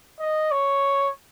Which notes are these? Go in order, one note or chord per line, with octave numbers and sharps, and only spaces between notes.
D#5
C#5